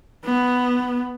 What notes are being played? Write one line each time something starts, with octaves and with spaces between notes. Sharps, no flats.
B3